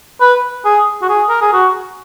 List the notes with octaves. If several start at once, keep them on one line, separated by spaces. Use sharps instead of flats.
B4
G#4
F#4
G#4
A#4
G#4
F#4